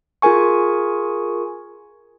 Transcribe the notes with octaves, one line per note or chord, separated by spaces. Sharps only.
F4 G#4 A#4 G#5 C#6